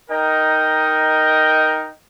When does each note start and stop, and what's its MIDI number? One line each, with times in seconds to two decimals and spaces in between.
0.10 1.90 63
0.10 1.90 70
0.10 1.90 75
0.10 1.90 79